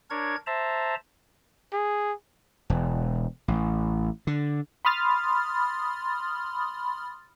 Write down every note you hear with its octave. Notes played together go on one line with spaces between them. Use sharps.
D4 A#4 C#5 G#6
C5 E5 A5 A#5
G#4
E1
A1
D3
B5 C6 D#6 F6 A6